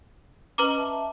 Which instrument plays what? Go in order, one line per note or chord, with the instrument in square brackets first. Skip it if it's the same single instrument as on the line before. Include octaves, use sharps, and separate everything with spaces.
[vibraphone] C#4 D#5 [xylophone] B4 A#5 D6
[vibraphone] E5 A5